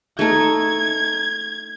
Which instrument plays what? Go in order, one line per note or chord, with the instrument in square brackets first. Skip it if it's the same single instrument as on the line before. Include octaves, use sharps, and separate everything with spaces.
[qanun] A3 D#4 A4 [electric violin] G#6